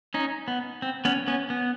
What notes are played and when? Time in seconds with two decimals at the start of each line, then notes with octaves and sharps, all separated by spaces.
0.14 C#4 D#4
0.48 B3
0.82 C4
1.05 B3 C#4
1.28 B3 C#4
1.50 B3